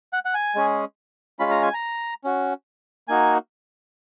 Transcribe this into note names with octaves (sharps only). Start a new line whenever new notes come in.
F#5
F#5
G#5
G#3 C#4 G#4
G#3 C#4 F4 B5
A#5
G#5
A#5
C#4 F#4
A#3 D#4 F#4 G#5